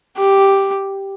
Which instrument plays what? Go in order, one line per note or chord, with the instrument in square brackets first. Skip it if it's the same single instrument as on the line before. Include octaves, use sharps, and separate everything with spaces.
[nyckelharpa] G4